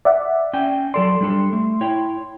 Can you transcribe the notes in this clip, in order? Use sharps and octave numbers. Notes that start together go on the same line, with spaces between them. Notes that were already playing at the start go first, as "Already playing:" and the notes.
D5 E5 F#5
C#4 G5 G#5
F#3 A4 D5 C6
G3 D4 A4
A3
E4 C#5 G5